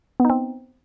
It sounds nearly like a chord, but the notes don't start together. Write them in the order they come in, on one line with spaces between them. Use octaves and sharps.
B3 D#4 C4